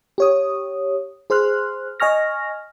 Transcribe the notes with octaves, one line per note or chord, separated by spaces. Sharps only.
G4 C#5 D#6
G#4 C5 C6 F6 F#6
D#5 G#5 C#6 F6 A#6